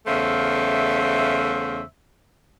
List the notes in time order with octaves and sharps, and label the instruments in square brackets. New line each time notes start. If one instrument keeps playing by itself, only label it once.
[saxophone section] E2 C#3 A3 C5 E5 F5